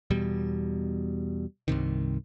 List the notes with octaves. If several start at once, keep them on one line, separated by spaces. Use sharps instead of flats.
E2 B2 G3
C2 G2 C3 D#3